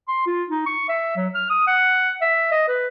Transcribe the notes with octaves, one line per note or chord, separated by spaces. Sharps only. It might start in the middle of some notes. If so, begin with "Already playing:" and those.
C6
F4
D#4
C#6
E5
F#3
F6
D#6
F#5
E5
D#5
B4